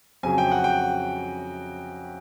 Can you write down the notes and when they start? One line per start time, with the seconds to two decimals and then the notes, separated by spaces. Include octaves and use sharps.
0.23 F2 C#3 F#3 G#5
0.38 G5
0.51 F#5
0.64 G5